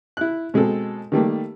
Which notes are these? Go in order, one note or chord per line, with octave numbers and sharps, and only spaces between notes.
E4 F#6
B2 G#3 C4 A4
D#3 G3 A3 A#3